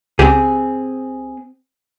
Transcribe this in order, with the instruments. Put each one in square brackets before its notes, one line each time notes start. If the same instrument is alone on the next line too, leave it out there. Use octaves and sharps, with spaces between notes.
[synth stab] C#2 G4 [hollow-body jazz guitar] C4 G#4